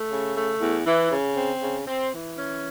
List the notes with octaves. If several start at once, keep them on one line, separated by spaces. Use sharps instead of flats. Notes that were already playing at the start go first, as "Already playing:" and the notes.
Already playing: A3
C#3
A3
E2
E3
C#3
C4
C#3
C4
E3
C#4